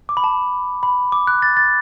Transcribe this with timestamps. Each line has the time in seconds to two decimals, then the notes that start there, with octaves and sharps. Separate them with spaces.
0.09 D6
0.17 B5
0.24 A5
0.83 B5
1.12 D6
1.27 F#6
1.42 A6
1.57 A6